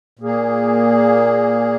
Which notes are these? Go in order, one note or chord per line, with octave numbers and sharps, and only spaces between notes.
A#2 A#3 G#4